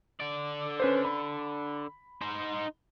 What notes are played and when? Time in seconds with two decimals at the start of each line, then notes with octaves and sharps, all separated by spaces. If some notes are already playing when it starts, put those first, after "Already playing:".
0.20 D3 D5
0.80 C#4 B4 C5
1.05 B5
2.21 D#4 C5